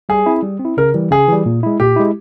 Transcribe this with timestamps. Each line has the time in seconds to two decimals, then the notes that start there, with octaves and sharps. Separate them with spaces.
0.09 G3 G#4
0.26 C4 E4
0.42 G3
0.60 C4
0.65 E4
0.77 C#3 A#4
0.94 E3 G3
1.11 C#3 G#4
1.28 E3 G3
1.46 A#2
1.63 G#3 E4
1.80 A#2 G4
1.96 G#3 E4